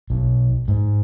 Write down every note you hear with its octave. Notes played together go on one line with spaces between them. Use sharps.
B1
G#2